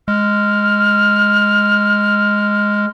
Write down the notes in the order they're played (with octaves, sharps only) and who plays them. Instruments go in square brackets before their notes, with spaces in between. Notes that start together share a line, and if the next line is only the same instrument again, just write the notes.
[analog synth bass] G#3 [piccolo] F6